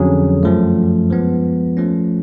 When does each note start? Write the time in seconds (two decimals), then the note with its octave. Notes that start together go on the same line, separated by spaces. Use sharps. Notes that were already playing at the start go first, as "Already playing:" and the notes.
Already playing: F2 D3 F#3 C#4 G#4
0.43 F#2 F3 A3
1.10 F3 G#3 B3
1.77 F3 A3 C#4